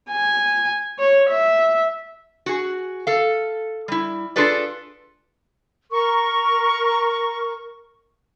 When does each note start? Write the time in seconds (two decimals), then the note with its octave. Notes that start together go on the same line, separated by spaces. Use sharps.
0.10 G#5
0.99 C#5
1.30 E5
2.46 F#4 G#4
3.07 A4 F5
3.88 G3 E4
4.36 D4 F4 G#4 A4 B4 D5
5.91 A#4 C#6